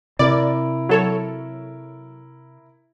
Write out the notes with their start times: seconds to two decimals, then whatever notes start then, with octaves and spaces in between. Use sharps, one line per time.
0.19 C3 C4 E4 A#4 D5
0.89 F#3 A4 C#5